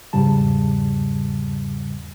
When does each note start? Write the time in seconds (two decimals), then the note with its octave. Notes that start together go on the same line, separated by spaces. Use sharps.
0.13 E2 G#2 C#3 G3 A5